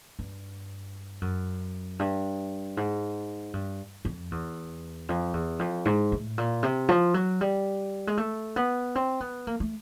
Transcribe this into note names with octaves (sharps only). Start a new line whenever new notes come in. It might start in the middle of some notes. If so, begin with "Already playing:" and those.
G2
F#2
G2
G#2
G2
F2
E2
F2
E2
F2
G#2
A2
A#2
C3
F3
F#3
G3
G#3
A3
B3
C4
B3
A#3
A3